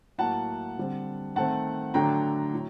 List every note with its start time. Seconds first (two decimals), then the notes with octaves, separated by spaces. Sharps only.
0.18 A2 F#3 A#3 F#5 A5
0.78 D3 G3 C4
1.35 D#3 A3 C4 F#5 A5
1.94 D3 F#3 A3 D4 G5 A#5
2.53 A2 F#3